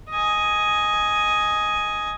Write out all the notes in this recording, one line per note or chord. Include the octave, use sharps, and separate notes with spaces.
D#5 G#5